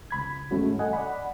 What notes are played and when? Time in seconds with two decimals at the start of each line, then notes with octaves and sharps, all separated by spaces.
0.11 C#2 B5 G#6
0.51 G#2 E3 G#3 A3 C#4 F#4
0.79 G2 A4 D#5 F#5 G#5
0.93 D5 F#5 B5